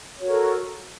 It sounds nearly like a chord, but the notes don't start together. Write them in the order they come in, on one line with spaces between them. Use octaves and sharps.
C#5 F#4 A#4 A4